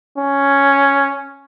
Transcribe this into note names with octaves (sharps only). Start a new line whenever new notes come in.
C#4